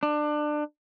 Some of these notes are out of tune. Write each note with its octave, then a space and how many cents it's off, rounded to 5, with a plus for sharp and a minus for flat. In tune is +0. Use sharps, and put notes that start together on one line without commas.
D4 +25